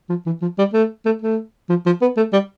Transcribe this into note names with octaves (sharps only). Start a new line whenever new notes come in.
F3
E3
F3
G3
A3
A3
A3
F3
F3
B3
A3
G3